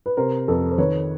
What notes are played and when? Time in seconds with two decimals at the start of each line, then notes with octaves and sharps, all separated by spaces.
0.06 B4
0.17 C3 A#4 C5
0.48 F2 A4 B4
0.72 C5
0.78 D#3 B4 C#5